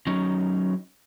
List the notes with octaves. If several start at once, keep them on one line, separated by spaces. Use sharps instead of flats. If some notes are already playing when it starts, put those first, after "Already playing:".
F#3 C#4 D#4